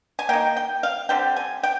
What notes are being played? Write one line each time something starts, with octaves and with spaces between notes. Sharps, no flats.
G#5
D#3 A#3 G5
G5
F5
D3 G3 C4 G5
G#5
G5